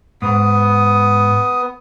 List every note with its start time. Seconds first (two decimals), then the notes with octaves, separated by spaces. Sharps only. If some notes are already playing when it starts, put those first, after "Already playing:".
0.22 G#2 B3 D#6